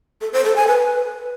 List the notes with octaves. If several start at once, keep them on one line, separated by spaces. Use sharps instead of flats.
A4
C5
A4
G#5
B4